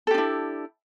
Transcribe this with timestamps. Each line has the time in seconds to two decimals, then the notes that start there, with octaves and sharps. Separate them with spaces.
0.07 A4
0.11 G4
0.14 D4
0.18 E4